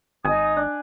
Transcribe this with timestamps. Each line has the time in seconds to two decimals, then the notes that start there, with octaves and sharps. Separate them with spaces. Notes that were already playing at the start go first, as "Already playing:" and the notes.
0.25 G#1 D#4 G#5 D#6
0.57 D4